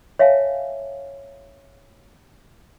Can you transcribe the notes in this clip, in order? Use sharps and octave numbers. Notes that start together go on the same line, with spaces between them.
C#5 E5 F5 G#5 A5